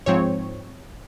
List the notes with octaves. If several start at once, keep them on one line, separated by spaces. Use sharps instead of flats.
G#2 F3 C4 C#5